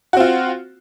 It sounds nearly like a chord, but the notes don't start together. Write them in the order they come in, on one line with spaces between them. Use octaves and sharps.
F#4 C4 F4